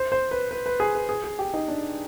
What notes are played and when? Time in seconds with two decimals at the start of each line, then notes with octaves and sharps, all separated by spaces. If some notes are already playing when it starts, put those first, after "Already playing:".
Already playing: C5
0.12 C5
0.31 B4
0.51 B4
0.66 B4
0.80 G#4
0.95 B4
1.09 G#4
1.24 G#4
1.39 G4
1.54 D#4
1.68 D4